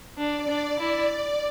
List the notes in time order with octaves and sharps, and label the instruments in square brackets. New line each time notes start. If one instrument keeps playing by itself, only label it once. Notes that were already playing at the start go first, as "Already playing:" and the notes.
[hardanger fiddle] D4 [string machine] D5
[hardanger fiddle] D4
[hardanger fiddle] E4 [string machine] D5